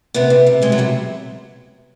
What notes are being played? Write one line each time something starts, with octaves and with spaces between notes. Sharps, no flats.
C3 B3
C3
C3
C3 G#3
F#3
C3 G3